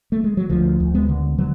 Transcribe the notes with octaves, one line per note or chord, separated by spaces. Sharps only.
A3
G#3
F#3
D2 F3
D2
G#3 B3
D3
D3 F#3